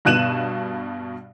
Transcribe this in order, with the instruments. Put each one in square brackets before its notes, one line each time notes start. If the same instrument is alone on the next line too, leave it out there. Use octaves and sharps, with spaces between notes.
[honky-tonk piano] G2 B2 F#6 D#7 E7 F#7